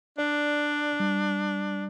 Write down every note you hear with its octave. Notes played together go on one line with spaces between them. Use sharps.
D4 D5
G3